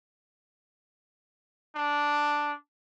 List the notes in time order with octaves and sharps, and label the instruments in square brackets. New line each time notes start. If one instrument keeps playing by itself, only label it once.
[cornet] D4